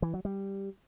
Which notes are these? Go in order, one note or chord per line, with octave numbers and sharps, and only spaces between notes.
E3
F#3
G3